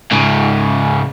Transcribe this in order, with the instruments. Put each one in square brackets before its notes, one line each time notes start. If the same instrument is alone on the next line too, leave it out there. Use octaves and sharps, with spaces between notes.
[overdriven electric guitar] G#2 C#3